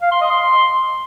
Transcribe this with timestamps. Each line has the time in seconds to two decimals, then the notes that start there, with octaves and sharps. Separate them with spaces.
0.02 F5
0.11 C6
0.21 D#5
0.30 C6